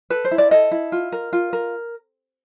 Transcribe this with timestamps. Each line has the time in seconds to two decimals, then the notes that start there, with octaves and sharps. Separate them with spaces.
0.10 A4 B4
0.25 C5
0.31 E4
0.38 D5
0.51 A4 D#5
0.71 E4
0.92 F4
1.12 A#4
1.33 F4
1.53 A#4